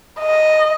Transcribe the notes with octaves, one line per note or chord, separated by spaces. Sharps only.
D#5